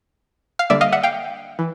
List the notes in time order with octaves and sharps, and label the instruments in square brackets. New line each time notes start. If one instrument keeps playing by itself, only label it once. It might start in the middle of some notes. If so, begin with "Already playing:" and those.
[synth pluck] F5
D3 G3 A#3 D5 E5
D#5 F5
E5 F#5
F5 G5
E3